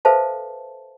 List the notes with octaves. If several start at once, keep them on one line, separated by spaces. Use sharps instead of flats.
A4 B4 C5 E5 F5 A5